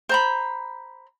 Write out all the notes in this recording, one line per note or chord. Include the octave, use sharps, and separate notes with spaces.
C5 A#5 B5